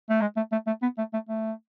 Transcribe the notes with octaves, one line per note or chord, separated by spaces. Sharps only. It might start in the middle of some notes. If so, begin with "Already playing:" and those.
A3
G#3
A3
A3
A3
B3
A3
A3
A3